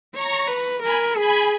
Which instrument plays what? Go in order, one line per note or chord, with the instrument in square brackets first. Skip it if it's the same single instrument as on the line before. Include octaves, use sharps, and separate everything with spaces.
[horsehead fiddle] C#5 [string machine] A#5 C#6
[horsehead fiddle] B4
[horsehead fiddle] A#4 [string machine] G#5 B5
[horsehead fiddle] G#4 [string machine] G#5 B5